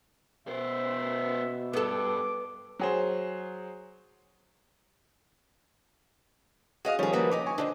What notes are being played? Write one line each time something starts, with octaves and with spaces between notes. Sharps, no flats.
B2 B3 C5 E5
G2 B3 A4 D6
F#3 G#4 C5
F#4 G#4 D#5 F5 D#6
D#3 F3 G3 C#4 G#4
A#3 F#4 B4
C#3 D#4 G4 D6
G#5 C#6
G2 A#2 D3 D4 C5 D#5